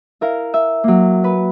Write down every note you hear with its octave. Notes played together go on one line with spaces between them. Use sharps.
E4 A#4 F5
E5
F#3 A#3
B4